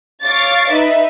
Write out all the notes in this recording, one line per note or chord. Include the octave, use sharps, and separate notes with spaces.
C#5 F5 C#6 D6 A6
D#4 B4 E5